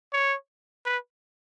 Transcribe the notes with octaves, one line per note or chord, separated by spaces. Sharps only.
C#5
B4